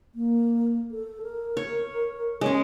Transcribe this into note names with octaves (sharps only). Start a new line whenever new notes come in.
A#3
A4
A#4
C#5
G#3 C#4 C#5